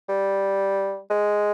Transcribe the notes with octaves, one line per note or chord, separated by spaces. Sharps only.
G3
G#3